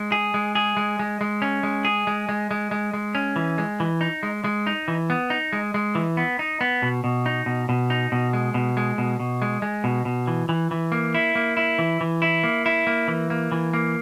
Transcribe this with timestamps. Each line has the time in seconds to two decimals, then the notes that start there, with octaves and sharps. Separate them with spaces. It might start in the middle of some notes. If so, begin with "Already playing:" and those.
Already playing: G#3
0.12 G#4
0.34 G#3
0.55 G#4
0.77 G#3
0.99 G#3
1.21 G#3
1.42 C#4
1.63 G#3
1.85 G#4
2.07 G#3
2.29 G#3
2.51 G#3
2.71 G#3
2.93 G#3
3.15 C#4
3.36 E3
3.58 G#3
3.80 E3
4.01 D#4
4.23 G#3
4.44 G#3
4.67 D#4
4.88 E3
5.10 B3
5.30 D#4
5.53 G#3
5.74 G#3
5.95 E3
6.17 B3
6.39 D#4
6.61 B3
6.82 B2
7.04 B2
7.26 D#4
7.46 B2
7.69 B2
7.90 D#4
8.12 B2
8.33 G#3
8.54 B2
8.77 G#3
8.98 B2
9.20 B2
9.42 G#3
9.62 G#3
9.84 B2
10.05 B2
10.27 E3
10.49 E3
10.71 E3
10.92 A#3
11.15 E4
11.35 A#3
11.57 E4
11.79 E3
12.01 E3
12.22 E4
12.43 A#3
12.66 E4
12.87 A#3
13.08 E3
13.30 A#3
13.52 E3
13.73 A#3